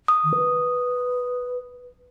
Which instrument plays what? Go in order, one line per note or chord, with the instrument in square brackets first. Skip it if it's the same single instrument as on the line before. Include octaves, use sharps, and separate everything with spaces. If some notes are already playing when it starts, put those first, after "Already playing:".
[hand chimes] D#6
[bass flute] D#3
B4